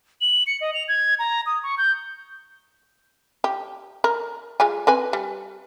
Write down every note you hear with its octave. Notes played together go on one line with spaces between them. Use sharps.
F#7
C#7
D#5
F7
G#6
A#5
D#6
C#6
G6
G4
A#4
G#3 F4 G#5
C4 B4 G#5
G3